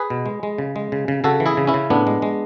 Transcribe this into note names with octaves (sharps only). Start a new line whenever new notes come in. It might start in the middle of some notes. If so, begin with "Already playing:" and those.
Already playing: G#4 B4
B2
G#3
G#3
C#3
G#3
C#3
C#3
C#3 F#4 A4
E3
E4 G#4
C#3
C#4 E4
C#3
A2 B3 D4
G#3
G#3